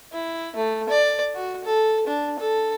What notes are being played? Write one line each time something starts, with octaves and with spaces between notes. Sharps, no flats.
E4
A3
D5
F#4
A4
D4
A4